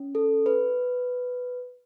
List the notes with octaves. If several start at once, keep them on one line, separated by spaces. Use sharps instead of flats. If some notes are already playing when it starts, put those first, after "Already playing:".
Already playing: C#4
A4
B4